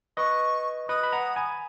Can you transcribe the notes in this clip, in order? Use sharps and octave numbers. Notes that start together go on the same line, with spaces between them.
B4 D#5 C#6
B4 D#5 D#6
B5
F#5 A#5
G#5 B5